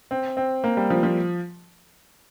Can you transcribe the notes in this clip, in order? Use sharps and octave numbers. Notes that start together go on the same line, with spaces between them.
C4
C4
A#3
G3
F3
F3